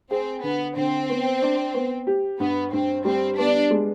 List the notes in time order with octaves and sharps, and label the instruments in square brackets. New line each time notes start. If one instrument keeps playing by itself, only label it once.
[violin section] C4 [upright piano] G#4
[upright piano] D3 [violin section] B3
[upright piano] D3 [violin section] C4
[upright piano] B3
D4
B3
G4
[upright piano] G2 [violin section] B3
[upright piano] G2 [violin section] C4
[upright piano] G3 [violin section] C4
[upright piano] B3 [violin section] D4
[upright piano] G#3